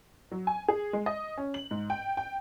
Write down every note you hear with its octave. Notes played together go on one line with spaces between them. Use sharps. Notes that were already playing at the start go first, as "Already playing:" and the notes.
F#3
G#5
G#4
G#3
D#5
C#4
F#7
G#2
G5
G5